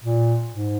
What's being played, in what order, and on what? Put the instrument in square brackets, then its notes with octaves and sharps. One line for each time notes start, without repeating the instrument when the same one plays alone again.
[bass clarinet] A#2
G#2